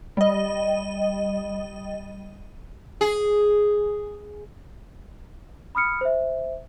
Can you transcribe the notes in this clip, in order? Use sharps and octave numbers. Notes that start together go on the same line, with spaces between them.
G3 D#5
G#4
B5 D#6 F6 C#7
C5 E5